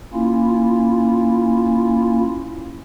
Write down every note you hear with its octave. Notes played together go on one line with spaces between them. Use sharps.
A#3 C#4 E4 F4